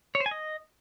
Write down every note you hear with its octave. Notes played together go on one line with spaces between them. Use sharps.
C#5
C5
G#5
D#5